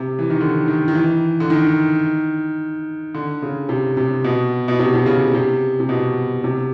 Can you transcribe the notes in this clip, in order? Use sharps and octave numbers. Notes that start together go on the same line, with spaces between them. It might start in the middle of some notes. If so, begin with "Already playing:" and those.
Already playing: C3
E3
D#3
D3
D#3
D#3
E3
D3
D#3
D3
C#3
C3
C3
B2
B2
C3
C3
C#3
C3
C3
B2
C3